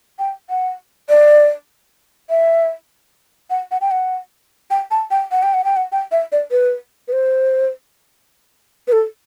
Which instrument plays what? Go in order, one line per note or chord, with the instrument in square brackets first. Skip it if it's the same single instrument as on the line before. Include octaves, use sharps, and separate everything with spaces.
[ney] G5
F#5
D5
E5
F#5
F#5
G5
F#5
G5
A5
G5
F#5
G5
F#5
G5
F#5
G5
E5
D5
B4
B4
C5
B4
A4